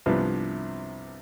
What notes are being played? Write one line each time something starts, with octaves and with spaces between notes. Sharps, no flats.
C2 C3 F3 B3 D4